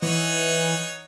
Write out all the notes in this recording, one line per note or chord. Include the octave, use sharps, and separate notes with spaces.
E3 D#4 C#5 F#5